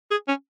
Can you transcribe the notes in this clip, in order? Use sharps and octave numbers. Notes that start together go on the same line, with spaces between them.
G#4
C#4